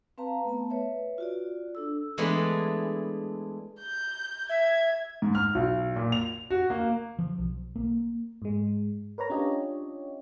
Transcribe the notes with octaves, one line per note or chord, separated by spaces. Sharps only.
C4 B4 F5 A5 A#5
A3 B3 A5
B4 C#5 E5
F4 F#4 D5
D4 A4 E6
E3 G#3 A3 B3 D4 E4
G6
E5 G#6
G#2
F6
B1
A#2
F7
F#4
A#3
F3
B1
A#3
G#2 G#3
A#4 B4 C#5 A#5
C#4 D4 F4 G4 C#5 D#5